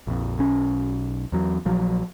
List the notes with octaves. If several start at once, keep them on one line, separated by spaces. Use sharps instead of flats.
A#1 F2
B1 C#4
E2 F#3
A#1 F3 F#3